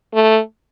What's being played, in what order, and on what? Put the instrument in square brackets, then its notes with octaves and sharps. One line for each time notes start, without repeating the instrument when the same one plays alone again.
[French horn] A3